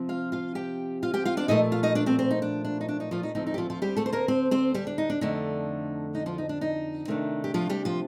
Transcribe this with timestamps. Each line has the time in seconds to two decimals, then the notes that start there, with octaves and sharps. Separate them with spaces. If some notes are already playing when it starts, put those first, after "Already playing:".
Already playing: C3 F3 C4
0.09 F4 F5
0.32 F4 F5
0.55 G4 G5
1.03 F4 F5
1.14 G4 G5
1.25 F4 F5
1.37 D4 D5
1.48 A#2 F3 A3 D#4 D#5
1.72 F4 F5
1.83 D#4 D#5
1.95 D4 D5
2.06 C4 C5
2.19 C4 C5
2.31 D#4
2.42 D4
2.65 D4
2.81 D#4
2.88 D4
3.00 D#4
3.11 F3 F4
3.23 D#4
3.35 D2 D3 F3 A3 C4 D#4
3.47 D#4
3.54 G4
3.58 F3 F4
3.70 F3 F4
3.82 G3 G4
3.97 A3 A4
4.06 C5
4.12 A#3 A#4
4.28 C4 C5
4.51 C4 C5
4.74 G3 G4
4.87 D4
4.98 D#4
5.10 D4
5.21 F2 D3 A3 D4 D#4
6.15 D#4
6.26 F3 F4
6.38 D#4
6.49 D4
6.61 D#4
7.08 C3 D#3 A3 D4
7.44 G4
7.54 F3 F4
7.69 G3 G4
7.85 F3 F4